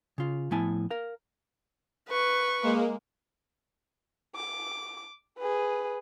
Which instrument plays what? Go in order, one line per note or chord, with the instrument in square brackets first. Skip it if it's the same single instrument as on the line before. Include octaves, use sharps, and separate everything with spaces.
[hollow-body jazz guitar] C#3 F4
A2 F3 B3 E4 G#5 A5
A#4 F5
[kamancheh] B4 C#6
[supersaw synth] G#3 A#3
[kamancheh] D6
G#4 B4